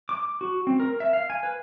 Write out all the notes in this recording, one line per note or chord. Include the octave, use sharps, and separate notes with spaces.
D6
F#4
C4
A#4
E5
F5
G#5
B4